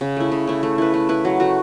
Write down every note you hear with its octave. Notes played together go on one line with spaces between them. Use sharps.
C#3
A3 E4
C#3
A3 E4
A3
E4 B4
A3
E4 B4
F#3
A3 F#4